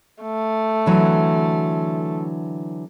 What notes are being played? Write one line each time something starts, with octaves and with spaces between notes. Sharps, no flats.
A3
D3 E3 F#3